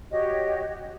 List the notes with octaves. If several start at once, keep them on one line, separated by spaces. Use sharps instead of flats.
F#4 G4 C#5 D#5